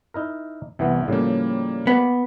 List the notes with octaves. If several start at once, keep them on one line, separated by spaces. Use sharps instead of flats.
D#4 E4 A#4
C2 C3 E3 B3
A2 C#3 F3 G3 A#3
B3